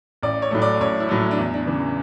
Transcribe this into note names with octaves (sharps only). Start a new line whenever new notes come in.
A1 D5
C#5
A2 F#3 A3
D5
A1 C#5
E4
A2 F#3 A3
E4
D4
E2
D4
C#3 E3